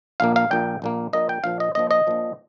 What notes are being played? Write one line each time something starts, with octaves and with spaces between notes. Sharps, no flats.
A#1 A#2 A#3 F5
F5
A#1 A#2 A#3 G5
A#1 A#2 A#3
A#1 A#2 A#3 D#5
G5
A#1 A#2 F3 F5
D#5
A#1 A#2 F3 D#5
D#5
A#1 A#2 F3